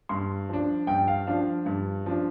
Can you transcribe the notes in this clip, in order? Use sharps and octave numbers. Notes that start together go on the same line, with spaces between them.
G2 C6
F3 D4
G2 G5
F5
F3 D4 F5
G2
F3 D4